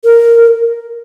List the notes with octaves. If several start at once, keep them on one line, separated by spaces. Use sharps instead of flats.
A#4